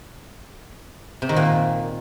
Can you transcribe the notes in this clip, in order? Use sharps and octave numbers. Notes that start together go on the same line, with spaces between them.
C3
D#3
A#2